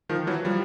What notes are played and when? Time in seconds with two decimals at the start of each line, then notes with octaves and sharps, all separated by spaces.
0.09 D#3 F3
0.27 E3 F#3
0.45 F3 G3